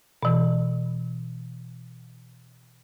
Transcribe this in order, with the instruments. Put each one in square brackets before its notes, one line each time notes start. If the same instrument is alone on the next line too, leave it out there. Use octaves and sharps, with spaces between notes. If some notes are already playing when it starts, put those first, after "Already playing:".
[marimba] B2 E3